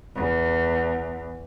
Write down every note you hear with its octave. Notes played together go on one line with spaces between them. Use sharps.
E2